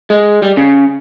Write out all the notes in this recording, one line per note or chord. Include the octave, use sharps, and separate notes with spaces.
G#3
G3
C#3